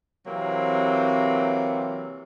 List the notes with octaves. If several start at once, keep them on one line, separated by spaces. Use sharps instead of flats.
C3 E3 F#3 A#3 C4